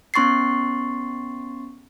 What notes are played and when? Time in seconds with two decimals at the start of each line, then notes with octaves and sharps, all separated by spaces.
0.14 B3 C#4 C6 C#6 A6 C7